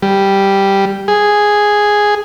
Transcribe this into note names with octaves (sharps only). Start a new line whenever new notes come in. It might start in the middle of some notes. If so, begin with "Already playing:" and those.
G3
G#4